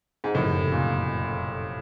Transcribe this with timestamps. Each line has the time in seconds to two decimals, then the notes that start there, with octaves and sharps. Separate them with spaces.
0.24 G#2
0.34 F#1 F2 A2 C3 D#3
0.72 A#2